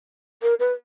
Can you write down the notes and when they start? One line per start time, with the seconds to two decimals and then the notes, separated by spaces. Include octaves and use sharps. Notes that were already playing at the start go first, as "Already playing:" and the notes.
0.42 A#4
0.60 B4